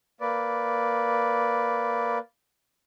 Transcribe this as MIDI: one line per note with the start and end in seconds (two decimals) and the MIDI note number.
0.21 2.18 58
0.21 2.18 71
0.21 2.18 74